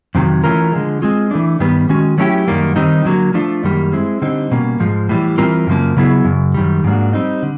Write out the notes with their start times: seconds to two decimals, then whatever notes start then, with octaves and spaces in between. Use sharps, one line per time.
0.15 F2 C3 D#3 F#3
0.44 E3 A3 C#4 F4 A#4
0.72 D3 F3 G#3
1.02 G#3 C4 F4 G#4
1.31 E3 A3 D4
1.60 G2 D#3 G3 B3
1.89 D#3 G#3 C#4 F#4
2.18 F#3 A3 C#4 E4 G4
2.48 F#2 D#3 G3 A#3
2.76 D#3 G3 C4 D#4
3.05 D3 F#3 A#3
3.34 F3 A3 D4 F4
3.64 F#2 D#3 G3 A#3
3.93 G#3 C4 E4
4.22 D3 G3 C4 D#4
4.51 B2 G3 A#3 C#4
4.80 G#2 F3 G#3
5.09 A2 E3 G3
5.38 E3 G3 C4 F4 A#4
5.67 F#2 C#3 F3 A#3
5.97 C#3 F#3 B3 E4 G#4
6.25 F#2 C#3
6.54 F#2 D#3 G3
6.84 G#2 F3 A#3 D4 F#4
7.13 G3 C4 D#4
7.43 D3